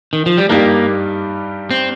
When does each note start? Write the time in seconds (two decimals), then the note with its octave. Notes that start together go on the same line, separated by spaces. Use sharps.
0.13 D#3
0.26 F3
0.37 G3
0.49 G2 G3 A#3 D#4 G4
1.71 C4